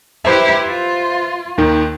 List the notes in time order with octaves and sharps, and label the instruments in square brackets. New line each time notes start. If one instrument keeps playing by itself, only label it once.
[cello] E4 G4 [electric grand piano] B4 C5 E5
[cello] F4
[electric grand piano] D#2 D#3